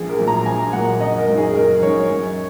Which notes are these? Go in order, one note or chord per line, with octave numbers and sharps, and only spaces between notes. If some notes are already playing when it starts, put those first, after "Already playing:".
Already playing: A#1 G#4
A#4
A#2 F#3 A#3
A#5
A#1 G#5
A#2 F#3 A#3 F#5
F#1 D#5
A#4
F#2 F#3 D#4
G#4
F#1 A#4
F#2 F#3 D#4 C#5
F#2